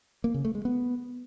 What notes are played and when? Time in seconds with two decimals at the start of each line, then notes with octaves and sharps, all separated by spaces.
0.24 A#3
0.34 C#3
0.45 A3
0.55 G#3
0.65 B3